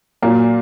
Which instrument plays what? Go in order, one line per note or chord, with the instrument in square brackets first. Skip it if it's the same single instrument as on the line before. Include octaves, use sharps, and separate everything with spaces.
[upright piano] A#2 F#3 A#3